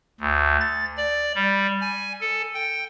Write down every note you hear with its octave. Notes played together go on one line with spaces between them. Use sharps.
D2
A6
D5
G3
G#5
A4
G5